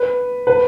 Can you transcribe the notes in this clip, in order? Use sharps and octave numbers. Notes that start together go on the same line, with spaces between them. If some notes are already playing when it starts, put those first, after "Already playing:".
Already playing: B4
B4